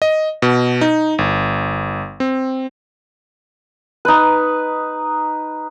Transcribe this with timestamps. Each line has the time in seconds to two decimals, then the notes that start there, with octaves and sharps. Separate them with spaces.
0.02 D#5
0.42 B2
0.81 D#4
1.18 G1
2.20 C4
4.05 D#4 B4